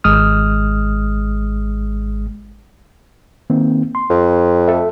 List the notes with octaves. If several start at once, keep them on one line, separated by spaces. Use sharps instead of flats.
G#1 G#3 D#6 F6
D#3 A#3 C4
C6
F2
A4 E5